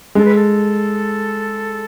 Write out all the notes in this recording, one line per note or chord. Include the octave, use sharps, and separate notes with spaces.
G#3 A4
B4
A4